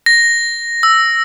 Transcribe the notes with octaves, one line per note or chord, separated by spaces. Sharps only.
A#6
E6